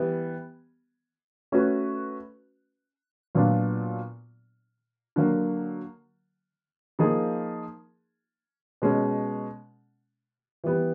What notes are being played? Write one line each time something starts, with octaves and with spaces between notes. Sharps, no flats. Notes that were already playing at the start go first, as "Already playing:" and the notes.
Already playing: E3 G3 B3
A3 C#4 F#4 B4
A#2 F#3 B3 D4 F4
D3 F#3 A#3
F3 A#3 D#4 G#4
B2 G#3 C#4
E3 G3 B3